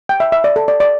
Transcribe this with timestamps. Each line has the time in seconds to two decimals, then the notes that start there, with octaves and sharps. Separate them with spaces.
0.09 G5
0.20 E5
0.32 E5
0.44 D5
0.56 A4
0.68 D5
0.80 D5